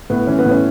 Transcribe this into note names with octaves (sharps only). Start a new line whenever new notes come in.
A2 B3
E3 C#4
B3
A2
C#4